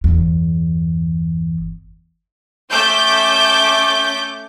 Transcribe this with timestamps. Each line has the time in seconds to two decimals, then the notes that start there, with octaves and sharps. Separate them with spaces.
0.04 G1 E2
2.71 A3 C#4 D6 G6